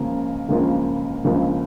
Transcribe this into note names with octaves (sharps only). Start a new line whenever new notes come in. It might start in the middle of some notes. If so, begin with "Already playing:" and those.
Already playing: C#2 C#3 F3 A#3 F4
C#2 C#3 F3 A#3 F4
C#2 C#3 F3 A#3 F4